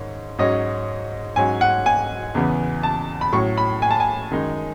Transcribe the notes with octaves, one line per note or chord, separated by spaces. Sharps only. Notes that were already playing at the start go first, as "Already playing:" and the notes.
Already playing: G#2 D#3 C#4
G#2 F#3 C#4 D#5
G#2 F#3 C#4 G#5
F#5
G#5
E2 C#3 E3 B3
A5
B5
A2 F#3 C#4 C#6
B5
G#5
A5
G#5
F#2 D#3 G#3 D#4